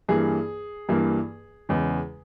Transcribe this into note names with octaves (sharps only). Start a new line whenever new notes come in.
G2 E3 A#3 G#4
G2 E3 A#3
E2 C#3 G#3